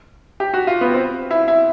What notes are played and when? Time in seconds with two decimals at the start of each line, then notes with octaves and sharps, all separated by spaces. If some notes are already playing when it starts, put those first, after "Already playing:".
0.40 G4
0.54 F#4
0.67 F4
0.81 B3
0.94 C4
1.31 E4
1.48 E4